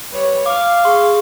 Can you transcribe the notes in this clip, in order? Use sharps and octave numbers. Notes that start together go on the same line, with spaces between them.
G3 B4 C#5
F5 D6
G#4 C6 C#6